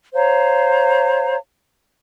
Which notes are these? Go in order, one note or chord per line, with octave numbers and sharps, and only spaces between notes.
C5 C#5 F5 A#5